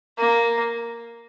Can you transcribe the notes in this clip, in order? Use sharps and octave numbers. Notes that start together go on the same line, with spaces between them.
A#3